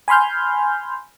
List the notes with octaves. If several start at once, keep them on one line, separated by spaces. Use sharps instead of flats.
G#5 B5 C6 F6 G6